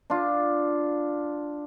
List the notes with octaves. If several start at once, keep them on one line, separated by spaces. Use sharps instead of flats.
D4 F4